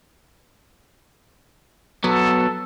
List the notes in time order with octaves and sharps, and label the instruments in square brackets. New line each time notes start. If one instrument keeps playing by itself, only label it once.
[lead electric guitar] F#3 B3 [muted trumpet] A4